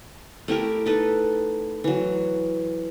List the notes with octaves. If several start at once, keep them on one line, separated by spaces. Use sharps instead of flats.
A3 E4 G4 A#4
D#4 A4 B4
E3 F#3